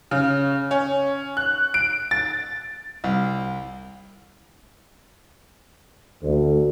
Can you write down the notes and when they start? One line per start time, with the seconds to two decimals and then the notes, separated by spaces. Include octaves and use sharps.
0.11 C#3
0.71 C#4
1.37 F#6
1.74 D7
2.11 A6
3.04 C2
6.23 D2